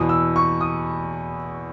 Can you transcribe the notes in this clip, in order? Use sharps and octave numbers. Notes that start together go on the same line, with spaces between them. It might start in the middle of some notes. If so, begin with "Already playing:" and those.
Already playing: E2 B2 D#6
E6
C#6
D#6